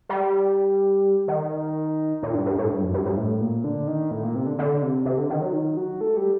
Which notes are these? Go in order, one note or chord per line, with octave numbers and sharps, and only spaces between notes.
G3
D#3
A#2
G2
G2
A2
G2
F#2
G2
G2
A2
A#2
D3
D#3
A2
A#2
C3
D3
D3
C3
C3
D3
D#3
F#3
D#3
F#3
A3
G3